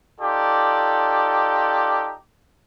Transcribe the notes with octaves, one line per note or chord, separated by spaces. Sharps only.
D#4 F4 G4 A4 D5